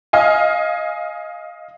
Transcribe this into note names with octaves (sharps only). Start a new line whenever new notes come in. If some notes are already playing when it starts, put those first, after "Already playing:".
D#5 F5 G#5